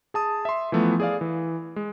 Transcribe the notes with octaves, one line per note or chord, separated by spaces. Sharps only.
G#4 A5 D#6
E5 C6
E3 F3 A3 B3
G#4 D5 F5
E3
G#3